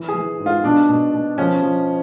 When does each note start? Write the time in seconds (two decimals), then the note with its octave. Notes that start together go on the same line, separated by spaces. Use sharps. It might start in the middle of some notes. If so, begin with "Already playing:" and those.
Already playing: E3
0.08 G#4
0.14 E3
0.39 G#2
0.46 F4
0.64 B2 D4
0.88 B2
1.14 B2
1.38 F3 C#4
1.62 F3